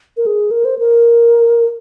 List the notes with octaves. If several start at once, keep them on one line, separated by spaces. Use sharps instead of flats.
A#4
G#4
A#4
C5
A#4